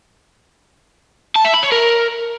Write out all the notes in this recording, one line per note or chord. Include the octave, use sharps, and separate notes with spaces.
A5
E5
B5
C#5
A#4